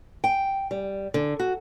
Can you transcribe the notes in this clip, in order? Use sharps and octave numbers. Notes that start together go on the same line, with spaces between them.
G5
G3
D3
F#4